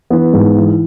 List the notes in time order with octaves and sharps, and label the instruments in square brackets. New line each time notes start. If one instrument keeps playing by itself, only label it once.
[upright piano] E3 B3
G#2
E3